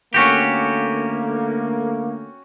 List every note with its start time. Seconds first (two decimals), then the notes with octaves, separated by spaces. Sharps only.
0.14 D3 A3 A#3 C#4 F#4 G4